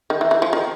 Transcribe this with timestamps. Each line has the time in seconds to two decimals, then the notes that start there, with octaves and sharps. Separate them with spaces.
0.10 D#3
0.21 E3
0.31 E3
0.42 F3
0.53 D#3